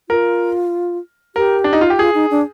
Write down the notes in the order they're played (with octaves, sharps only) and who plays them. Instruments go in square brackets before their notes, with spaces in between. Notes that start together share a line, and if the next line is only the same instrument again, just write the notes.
[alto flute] F4 [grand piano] A#4
[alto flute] G4 [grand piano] A#4
[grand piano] D4
D#4
F4
G4
[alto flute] F4 [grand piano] G#4
[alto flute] D#4
D4